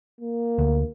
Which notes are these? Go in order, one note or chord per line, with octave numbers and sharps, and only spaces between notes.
A#3
D2